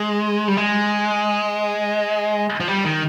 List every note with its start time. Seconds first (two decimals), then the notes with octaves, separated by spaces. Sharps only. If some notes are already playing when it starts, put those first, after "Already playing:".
Already playing: G#3
0.48 G3
0.57 G#3
2.61 F3
2.68 G3
2.85 D#3